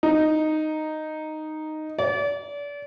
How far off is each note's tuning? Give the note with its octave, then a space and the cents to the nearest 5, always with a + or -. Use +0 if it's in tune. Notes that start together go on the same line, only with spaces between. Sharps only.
D#4 -5
D5 -35